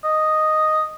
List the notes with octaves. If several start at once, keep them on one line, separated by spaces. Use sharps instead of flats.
D#5